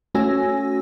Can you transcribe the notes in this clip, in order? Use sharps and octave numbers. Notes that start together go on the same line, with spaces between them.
A3 C#4 F#4 G#5 E6 A#6